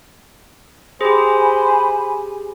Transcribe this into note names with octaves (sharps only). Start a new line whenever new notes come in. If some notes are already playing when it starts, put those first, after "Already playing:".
G4 G#4 C5 G#5 B5